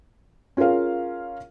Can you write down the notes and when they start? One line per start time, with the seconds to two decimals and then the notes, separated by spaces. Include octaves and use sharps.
0.57 C#4 F4 G#4 A#4 F5